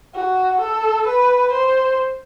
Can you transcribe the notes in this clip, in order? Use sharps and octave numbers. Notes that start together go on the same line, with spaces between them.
F#4
A4
B4
C5